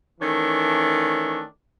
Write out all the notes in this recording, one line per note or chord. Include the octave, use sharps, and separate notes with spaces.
D#3 E3 A3 C#4 D4